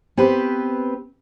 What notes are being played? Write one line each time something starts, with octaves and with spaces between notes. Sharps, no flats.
B3 C4 G4 B4